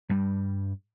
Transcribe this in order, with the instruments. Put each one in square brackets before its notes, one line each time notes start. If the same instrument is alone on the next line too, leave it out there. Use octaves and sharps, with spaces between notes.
[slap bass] G2 G3